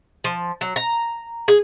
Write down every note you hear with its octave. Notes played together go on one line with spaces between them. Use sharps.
F3
F#3
A#5
G#4